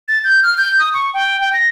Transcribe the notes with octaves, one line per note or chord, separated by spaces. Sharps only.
A6
G6
F6
G6
D#6
C#6
G5
G5
A#6